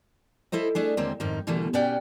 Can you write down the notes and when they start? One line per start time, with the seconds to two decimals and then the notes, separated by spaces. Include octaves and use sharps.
0.52 E4 A4 C5 D#5
0.75 A3 D4 G#4
0.97 D#2 D3 G#3 A#3 C4
1.20 F2 G#2 D#3 A#3 D#4
1.47 B2 D3 E3 G3 A3 A#3
1.73 B2 C#4 G4 D5 F#5 G5